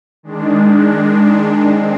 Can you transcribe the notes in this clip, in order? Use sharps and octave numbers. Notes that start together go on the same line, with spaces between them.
D#3 G#3 D4
G#3 C4